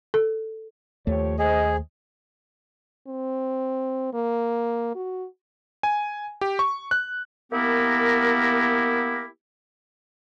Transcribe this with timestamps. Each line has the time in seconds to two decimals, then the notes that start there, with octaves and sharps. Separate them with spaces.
0.14 A4
1.07 D#2 F3 A3 G4 C#5
1.39 G#4 C5 D#5
3.07 C4
4.13 A#3
4.95 F#4
5.83 G#5
6.41 G4
6.59 C#6
6.91 F#6
7.52 A#3 B3 E4 G4 A#4